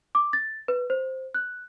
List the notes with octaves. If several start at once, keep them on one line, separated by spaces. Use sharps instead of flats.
D6
A6
B4
C5
F#6